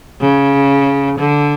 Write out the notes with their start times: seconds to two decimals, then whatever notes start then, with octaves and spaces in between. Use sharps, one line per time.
0.21 C#3
1.19 D3